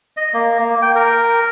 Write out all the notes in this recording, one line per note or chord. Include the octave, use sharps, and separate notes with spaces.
D#5
A#3
A#3
G5
A#4